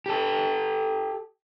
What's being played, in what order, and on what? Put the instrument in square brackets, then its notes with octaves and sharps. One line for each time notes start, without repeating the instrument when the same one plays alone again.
[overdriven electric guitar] G4 A4